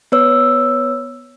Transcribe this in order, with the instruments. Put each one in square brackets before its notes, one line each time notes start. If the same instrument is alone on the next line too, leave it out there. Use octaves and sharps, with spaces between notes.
[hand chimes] B3 B4 C#5 E6